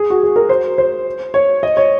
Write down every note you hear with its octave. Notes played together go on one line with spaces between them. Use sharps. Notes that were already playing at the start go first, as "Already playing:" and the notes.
Already playing: G#4
F#4
G#4
A#4
C5
C5
C#5
D#5
C#5